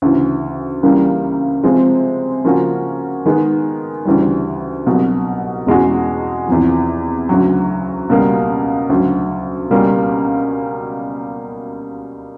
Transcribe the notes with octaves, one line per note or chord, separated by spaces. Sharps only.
D2 C#3 E3
C#2 C#3 E3 G3 A#3
C3 F3 G#3 C4
C#3 F3 A#3 C#4 F#4
D#3 G#3 B3
D2 C#3 E3 G3
C2 B2 F#3
E2 B2 G#3 C#4 F#4
E2 C3 F3
D2 C#3 F#3
C#2 B2 G3 A#3
D2 C#3 F#3
C#2 B2 G3 A#3 C#4